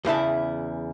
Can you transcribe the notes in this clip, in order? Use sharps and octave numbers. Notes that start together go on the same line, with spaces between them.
E2 C#3 E4 A5